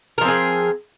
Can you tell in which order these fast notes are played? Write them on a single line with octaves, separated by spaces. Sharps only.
A#4 F3 C4 G#4